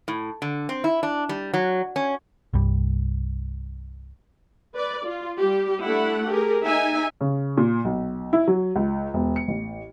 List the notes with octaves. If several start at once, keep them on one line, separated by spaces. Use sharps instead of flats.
A2
D3
C4
E4
D4
G3
F#3
C#4
C2 G2 G3
B4 D5
F4
G3 G4
A3 D4 E4 F#5
G4 G#4 A#4
D#4 E5 G#5
C#3
A#2
B1
E4
F#3
C#2
E1
C#7
A1